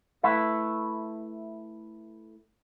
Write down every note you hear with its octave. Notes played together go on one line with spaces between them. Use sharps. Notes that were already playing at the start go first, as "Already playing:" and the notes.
A3 E4 B4 E5